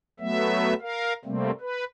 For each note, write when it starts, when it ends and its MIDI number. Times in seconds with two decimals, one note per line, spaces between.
0.20 0.74 54
0.20 0.74 57
0.20 0.74 59
0.20 0.74 76
0.81 1.13 70
0.81 1.13 77
1.25 1.51 48
1.25 1.51 55
1.25 1.51 57
1.25 1.51 58
1.25 1.51 60
1.61 1.84 71